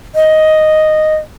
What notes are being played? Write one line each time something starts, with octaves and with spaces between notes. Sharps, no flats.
D#5